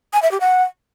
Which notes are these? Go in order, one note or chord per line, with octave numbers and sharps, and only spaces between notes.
G#5
E5
G4
F#5